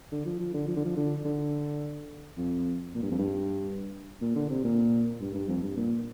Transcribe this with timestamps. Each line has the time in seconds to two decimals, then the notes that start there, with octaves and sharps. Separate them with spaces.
0.12 D3
0.25 F3
0.40 F3
0.54 D3
0.68 F3
0.76 D3
0.85 F3
0.96 D3
1.25 D3
2.37 F2
2.95 A#2
3.02 G2
3.11 F2
3.19 G2
4.21 A#2
4.36 D3
4.50 C3
4.64 A#2
5.21 G2
5.34 G2
5.49 F2
5.63 G2
5.77 A#2